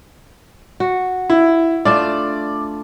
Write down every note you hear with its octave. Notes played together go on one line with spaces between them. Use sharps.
F#4
E4
A3 D4 F4 D5